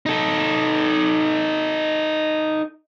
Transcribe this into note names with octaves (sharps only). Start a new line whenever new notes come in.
D#4 A4